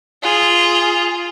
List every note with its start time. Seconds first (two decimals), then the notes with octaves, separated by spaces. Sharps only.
0.23 F4 G#4